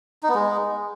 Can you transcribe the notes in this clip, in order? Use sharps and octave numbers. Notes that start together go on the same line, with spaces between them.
D#4
B3
G#3